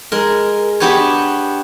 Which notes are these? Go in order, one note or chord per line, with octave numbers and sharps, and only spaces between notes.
G#3 A#4
B3 D4 F#4 G4 B4 C#5